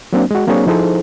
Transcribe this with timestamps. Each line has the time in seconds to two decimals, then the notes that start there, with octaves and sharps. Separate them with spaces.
0.13 F#3 A#3 C4 D4
0.31 G#3 F#4
0.47 F#3 A#3 C4 D4 G#4 C#5
0.66 F3 D#4 E4 G#4 A4 C5